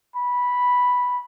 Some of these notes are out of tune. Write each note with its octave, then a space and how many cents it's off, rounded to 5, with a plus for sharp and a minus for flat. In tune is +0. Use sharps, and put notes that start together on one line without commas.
B5 -5